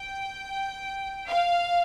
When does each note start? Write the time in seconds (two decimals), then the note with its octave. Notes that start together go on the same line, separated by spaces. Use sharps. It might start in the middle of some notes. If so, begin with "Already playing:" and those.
Already playing: G5
1.27 F5